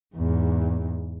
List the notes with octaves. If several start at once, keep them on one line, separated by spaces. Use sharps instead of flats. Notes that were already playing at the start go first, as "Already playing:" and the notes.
E2 G#2